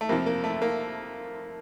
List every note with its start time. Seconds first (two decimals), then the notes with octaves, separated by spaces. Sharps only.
0.01 A3
0.09 F2 C3 F3 A#3
0.26 A#3
0.44 A3
0.62 A#3